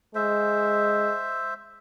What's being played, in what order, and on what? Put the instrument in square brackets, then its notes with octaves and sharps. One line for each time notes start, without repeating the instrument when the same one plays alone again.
[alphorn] G#3 [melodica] C5 E5